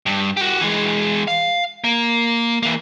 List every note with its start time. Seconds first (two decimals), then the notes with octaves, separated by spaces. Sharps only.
0.06 G2
0.37 F#4 G4
0.61 E3 G#3
1.28 F5
1.84 A#3
2.63 E3 A#3